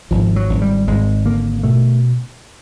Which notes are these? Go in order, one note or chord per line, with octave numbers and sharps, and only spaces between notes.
G#1 F3
F#3
G#1
G3
G#1 G#3
D3 A#3
B2 A3